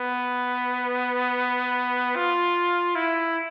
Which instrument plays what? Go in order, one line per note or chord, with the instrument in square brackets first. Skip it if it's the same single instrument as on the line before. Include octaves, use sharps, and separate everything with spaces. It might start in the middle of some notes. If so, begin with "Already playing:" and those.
Already playing: [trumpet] B3
F4
E4